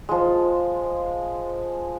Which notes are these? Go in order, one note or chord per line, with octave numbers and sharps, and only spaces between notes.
F3 G#3